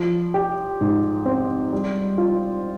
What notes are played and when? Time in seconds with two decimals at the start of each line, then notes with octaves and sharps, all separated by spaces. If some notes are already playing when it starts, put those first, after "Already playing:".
Already playing: F3
0.34 G4
0.81 G#2
1.26 C4
1.73 G3
2.18 F4